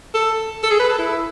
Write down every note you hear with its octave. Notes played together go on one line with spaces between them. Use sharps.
A4
A4
G#4
B4
A4
E4